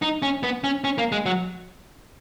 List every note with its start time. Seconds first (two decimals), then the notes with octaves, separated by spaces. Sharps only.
0.02 D#4
0.22 C#4
0.43 B3
0.64 C#4
0.84 C#4
0.98 A#3
1.12 G#3
1.26 F#3